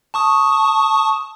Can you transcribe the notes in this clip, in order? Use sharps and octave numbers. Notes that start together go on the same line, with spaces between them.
A5 C#6 D#6